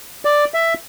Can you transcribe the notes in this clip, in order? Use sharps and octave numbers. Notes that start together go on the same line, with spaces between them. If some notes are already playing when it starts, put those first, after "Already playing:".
D5
E5